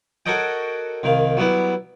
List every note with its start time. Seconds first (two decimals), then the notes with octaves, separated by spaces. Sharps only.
0.26 F#4 A4 A#4 C#5 D#5 G5
1.03 C2 D#3 F5
1.37 F#3 G3 B3 E4